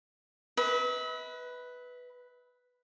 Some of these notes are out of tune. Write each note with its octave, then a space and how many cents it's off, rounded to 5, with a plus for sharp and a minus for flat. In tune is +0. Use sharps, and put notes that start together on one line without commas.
B4 +0 E5 -45